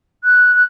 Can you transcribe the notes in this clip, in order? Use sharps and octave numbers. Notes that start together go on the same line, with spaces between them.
F#6